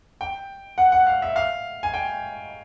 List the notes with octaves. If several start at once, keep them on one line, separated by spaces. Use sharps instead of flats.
G5
F#5
F#5
F5
E5
F5
G#5
G5